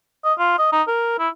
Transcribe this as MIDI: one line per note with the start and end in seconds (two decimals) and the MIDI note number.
0.25 0.33 75
0.39 0.56 65
0.59 0.68 75
0.72 0.82 63
0.88 1.16 70
1.19 1.29 64